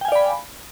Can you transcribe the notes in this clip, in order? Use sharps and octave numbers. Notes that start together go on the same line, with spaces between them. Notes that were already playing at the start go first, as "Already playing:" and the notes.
D5 F5 G5 G#5 B5